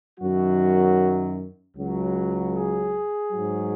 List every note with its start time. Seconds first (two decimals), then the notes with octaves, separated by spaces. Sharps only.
0.19 F#2 D#3 F#3 F#4
1.76 C#2 C#3 F#3
2.55 G#4
3.33 G#2 F#3